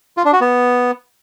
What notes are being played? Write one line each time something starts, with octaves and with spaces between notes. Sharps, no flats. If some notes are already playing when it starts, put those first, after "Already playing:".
F4
D4
F#4
B3